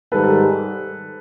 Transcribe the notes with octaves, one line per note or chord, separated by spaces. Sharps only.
G#2 D#3 G3 A4 B4